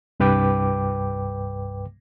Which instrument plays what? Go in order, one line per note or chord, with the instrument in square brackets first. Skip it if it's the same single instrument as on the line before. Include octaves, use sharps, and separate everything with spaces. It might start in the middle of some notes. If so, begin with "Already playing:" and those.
[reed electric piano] C2 G2 B4 G5 D6